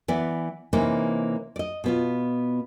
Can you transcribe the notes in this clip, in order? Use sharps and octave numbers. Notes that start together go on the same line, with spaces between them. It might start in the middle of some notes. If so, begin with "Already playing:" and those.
E3 B3 D5
C3 E3 A#3 C#4 D#4
D5 D#5
B2 B3 F4